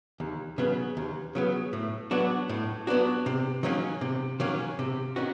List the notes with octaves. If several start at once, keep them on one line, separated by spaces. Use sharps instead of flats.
D#2
C#3 F#3 B3
D#2
C#3 F#3 B3
A2
F#3 B3 D4 F#4
A2
F#3 B3 D4 F#4
C3
D#3 F#3 A#3 C#4
C3
D#3 F#3 A#3 C#4
C3
D#3 C#4 F#4